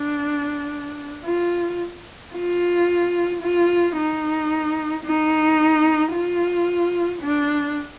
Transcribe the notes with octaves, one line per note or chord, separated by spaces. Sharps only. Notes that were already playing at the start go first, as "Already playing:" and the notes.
Already playing: D4
F4
F4
F4
D#4
D#4
F4
D4